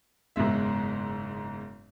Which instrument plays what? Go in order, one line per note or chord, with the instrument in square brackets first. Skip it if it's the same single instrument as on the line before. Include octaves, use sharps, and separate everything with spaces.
[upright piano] F#1 G#2 B2 G#3 E5